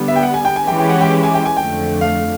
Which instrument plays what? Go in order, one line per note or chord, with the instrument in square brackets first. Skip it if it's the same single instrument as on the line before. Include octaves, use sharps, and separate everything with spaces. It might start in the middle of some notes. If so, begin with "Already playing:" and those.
Already playing: [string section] D3 G3 B3
[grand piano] E5
G5
F#5
G#5
G5
G#5
[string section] E3 G#3 C#4 E4 G4 [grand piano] G5
[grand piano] G5
F#5
G5
G#5
G5
G#5
[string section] F2 D3 F3 A3 [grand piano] G5
[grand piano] F5